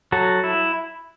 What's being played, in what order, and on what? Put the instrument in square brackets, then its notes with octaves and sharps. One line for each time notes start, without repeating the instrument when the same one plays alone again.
[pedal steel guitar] F#3 F#4 A4
E4